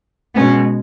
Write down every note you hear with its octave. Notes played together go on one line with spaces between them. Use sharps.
B2 G#3 B3 C#4